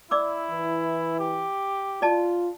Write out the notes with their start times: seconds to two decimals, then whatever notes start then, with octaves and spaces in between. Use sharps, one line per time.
0.11 E4 D5 D6 E6
0.50 E3
1.20 G4
2.02 F4 D5 D#5 A5